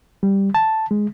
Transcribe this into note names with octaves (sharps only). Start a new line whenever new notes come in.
G3
A5
G#3